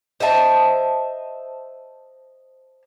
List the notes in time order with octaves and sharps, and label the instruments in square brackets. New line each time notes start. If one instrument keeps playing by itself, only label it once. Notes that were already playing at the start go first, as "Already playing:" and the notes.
[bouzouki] C5 D#5 E5 A5